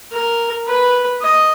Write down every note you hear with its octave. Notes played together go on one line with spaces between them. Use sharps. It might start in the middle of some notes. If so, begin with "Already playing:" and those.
A#4
B4
D#5